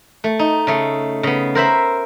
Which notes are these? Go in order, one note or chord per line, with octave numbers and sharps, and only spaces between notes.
A3
D#4
C#3 A3
C#3 B3
A#4 C5 E5 B5